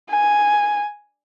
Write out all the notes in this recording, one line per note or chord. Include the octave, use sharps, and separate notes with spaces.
G#5